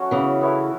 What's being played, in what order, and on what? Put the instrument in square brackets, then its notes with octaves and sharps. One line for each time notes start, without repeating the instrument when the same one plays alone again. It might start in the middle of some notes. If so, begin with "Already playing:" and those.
Already playing: [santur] F#3 A3 C#4 F#4 C#5
[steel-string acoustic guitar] C#3 E3
[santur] B3 E4 A4 C#5